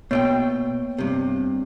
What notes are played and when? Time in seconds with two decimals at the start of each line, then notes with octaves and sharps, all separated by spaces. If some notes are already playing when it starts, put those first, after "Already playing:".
0.11 B2 A#3 B3 C#5 D5 G5
0.98 G2 C3